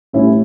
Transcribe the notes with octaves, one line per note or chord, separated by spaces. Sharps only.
A1 A2 G3 C#4 E4